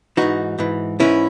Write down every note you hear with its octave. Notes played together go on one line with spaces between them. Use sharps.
G#2 E3 D#4 F#4
G#2 E3
G#2 E3 C#4 E4